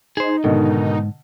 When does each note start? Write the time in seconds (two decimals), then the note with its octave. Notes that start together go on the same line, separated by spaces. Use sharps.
0.17 D#4 G#4 C5
0.44 G#2 B2 D3 D#3